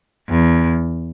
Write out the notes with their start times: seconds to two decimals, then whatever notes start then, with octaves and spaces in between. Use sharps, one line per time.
0.29 E2